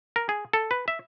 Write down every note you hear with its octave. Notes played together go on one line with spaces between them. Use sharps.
A#4
G#4
A4
B4
E5